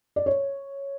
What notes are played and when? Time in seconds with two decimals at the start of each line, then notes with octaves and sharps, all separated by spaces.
0.16 D5
0.26 C#5